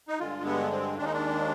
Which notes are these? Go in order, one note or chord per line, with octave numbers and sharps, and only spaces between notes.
D#4
G2 D3 G#3 F4
B3
C4
D#2 D#3 G#3 D4
D#4
D4